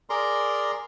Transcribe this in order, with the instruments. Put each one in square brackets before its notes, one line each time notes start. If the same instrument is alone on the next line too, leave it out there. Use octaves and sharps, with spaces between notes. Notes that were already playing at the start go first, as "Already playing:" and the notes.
[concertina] G#4 A#4 D5 A#5 C6